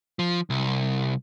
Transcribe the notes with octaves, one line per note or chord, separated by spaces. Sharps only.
F3
C2